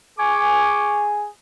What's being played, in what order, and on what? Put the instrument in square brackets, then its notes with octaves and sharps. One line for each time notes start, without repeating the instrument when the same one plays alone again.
[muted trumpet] G#4 [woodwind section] G#5 C#6 D6